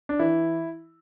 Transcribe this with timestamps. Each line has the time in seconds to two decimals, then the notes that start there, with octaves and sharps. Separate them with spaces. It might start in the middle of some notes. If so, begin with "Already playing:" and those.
0.09 D4
0.19 E3 E4